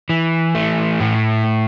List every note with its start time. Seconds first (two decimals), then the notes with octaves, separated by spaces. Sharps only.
0.09 E3
0.55 A3
1.00 A2